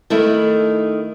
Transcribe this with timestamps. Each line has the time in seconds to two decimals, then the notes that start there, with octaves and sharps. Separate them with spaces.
0.10 D#3 A3 E4